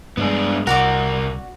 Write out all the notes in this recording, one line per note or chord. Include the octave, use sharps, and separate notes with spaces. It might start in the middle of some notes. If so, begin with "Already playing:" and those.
G2 G#3 B3 D4 G#4
C2 C3 F#4 A#4 D5 D6